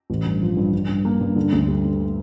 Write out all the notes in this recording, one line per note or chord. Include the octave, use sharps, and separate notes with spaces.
A1
G2
F3
G2
G2
G2
A#3
G2
D3
D2
G3
D3